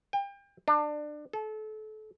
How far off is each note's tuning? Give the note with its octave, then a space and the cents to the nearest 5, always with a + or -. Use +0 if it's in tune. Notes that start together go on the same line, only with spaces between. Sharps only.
G5 +35
D4 +25
A4 -30